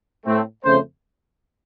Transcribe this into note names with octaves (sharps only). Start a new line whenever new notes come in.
A2 A3 C4
F2 C#3 A3 C#4 C5